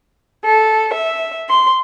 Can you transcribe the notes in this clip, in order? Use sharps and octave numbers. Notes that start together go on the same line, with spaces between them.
A4
E5
C6